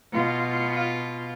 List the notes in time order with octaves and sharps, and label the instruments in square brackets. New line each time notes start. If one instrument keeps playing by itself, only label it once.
[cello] B2 F4